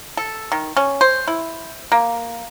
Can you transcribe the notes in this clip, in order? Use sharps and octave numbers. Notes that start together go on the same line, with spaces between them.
A4
D#3
C#4
C5
E4
A#3